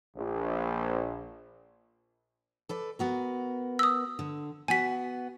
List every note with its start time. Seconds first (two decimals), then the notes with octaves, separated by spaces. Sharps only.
0.16 A#1
2.69 A4 B4 D5
2.99 B3 F#4 A#4
3.79 D#6 E6
4.19 D3
4.68 B3 F#4 G#5 B6